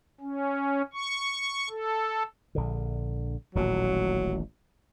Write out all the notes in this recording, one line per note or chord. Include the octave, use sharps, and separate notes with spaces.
C#4
C#6
A4
A#1 D3
D#1 A1 A#2 F#3